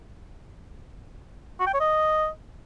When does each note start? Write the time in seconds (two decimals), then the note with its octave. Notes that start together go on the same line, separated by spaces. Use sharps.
1.60 F#4
1.67 G5
1.73 C#5
1.80 D#5